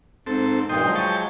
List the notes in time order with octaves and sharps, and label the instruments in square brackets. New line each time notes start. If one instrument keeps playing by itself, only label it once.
[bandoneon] G#2 [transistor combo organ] C4 A4
[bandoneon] G2 A#2 D#3 [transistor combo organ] D#5 G5 C6
[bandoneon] F3 F#3 G#3
[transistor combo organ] G5 A5 C#6